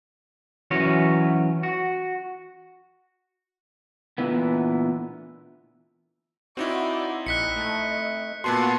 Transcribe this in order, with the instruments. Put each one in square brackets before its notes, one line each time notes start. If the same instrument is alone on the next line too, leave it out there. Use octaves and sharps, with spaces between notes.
[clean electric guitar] E3 F#3 C#4 F#4 B4 C#5
F#4
[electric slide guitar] A#2 D3 E3 B3
[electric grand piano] C4 D#4 E4 [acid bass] F#4 [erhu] D5
[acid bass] A#1 [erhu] D#5 [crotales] F#6 B6 C#7
[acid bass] A3
[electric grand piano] A#2 B3 C6 [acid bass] F#4 [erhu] A5